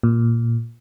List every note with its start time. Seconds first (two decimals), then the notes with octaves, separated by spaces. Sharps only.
0.03 A#2